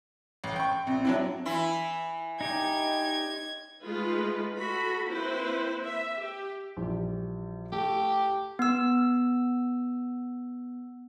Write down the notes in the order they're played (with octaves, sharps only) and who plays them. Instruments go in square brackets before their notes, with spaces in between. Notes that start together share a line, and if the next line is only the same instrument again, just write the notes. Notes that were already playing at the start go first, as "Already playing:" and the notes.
[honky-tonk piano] A1
G5 C#6
[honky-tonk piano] A#1 [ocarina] C4
[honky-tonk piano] F#3 D4 E4 [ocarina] C4
[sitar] E3 E4
[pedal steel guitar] D#4 G4 [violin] G#6
[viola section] G#3 A3 D#4 F4 G#4 B4
F#4 A4 B5
A#3 C4 E4 B4 C5
E5
G4
[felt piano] A#1 E3 G3
[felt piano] A3 [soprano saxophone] G4
[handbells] B3 E6